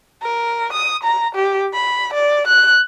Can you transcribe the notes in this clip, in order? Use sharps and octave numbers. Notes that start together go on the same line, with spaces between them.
A#4
D#6
A#5
G4
B5
D5
F#6